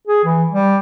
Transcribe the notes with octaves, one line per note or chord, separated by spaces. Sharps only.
G#4
E3
G3